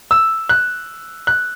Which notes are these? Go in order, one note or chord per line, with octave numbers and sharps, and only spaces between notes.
E6
F#6
F#6